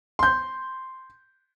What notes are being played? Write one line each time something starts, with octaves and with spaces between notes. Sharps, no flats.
C6 G6